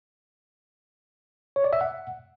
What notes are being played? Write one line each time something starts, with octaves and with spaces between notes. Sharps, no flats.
C#5
D5
E5
F#5